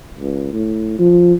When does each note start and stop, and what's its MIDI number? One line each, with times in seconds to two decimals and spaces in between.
0.19 0.50 37
0.53 0.98 45
0.99 1.34 53